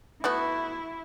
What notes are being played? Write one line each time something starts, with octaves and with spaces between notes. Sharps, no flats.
A3 B3 E4 F#4